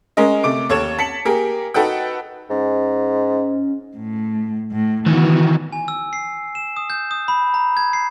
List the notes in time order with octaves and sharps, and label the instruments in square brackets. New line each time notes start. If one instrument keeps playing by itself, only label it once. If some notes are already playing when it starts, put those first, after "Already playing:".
[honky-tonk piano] G#3 C#4 A#4 D#5
C3 A3 D6 D7
D#2 A4 C#5 G#6 E7
A5 B6 C#7 F#7
A#3 G4 G#4 A#4
D#4 F#4 A4 B4 F#5 G5
[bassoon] G#2 [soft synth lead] C#4
[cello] A2
A2
[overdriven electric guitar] D#3 E3 [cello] B3 F#4
[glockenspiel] G#5
E6
C7
E7
D#6
G6
D#6
B5
A#5
G#6
C7